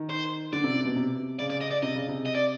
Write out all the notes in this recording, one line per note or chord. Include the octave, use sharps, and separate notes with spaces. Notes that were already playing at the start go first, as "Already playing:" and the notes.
Already playing: D#3
C5
D3 D5
C3
C3
B2
C3
C#3 D5
D5
D#5
D5
C3 D#5
C#3
C3
D#5
D5